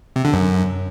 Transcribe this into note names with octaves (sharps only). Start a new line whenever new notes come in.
C3
D3
F#2